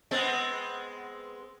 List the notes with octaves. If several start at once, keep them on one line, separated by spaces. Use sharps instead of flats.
G#3 B3 C4